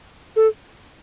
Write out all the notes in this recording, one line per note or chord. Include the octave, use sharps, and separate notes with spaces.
A4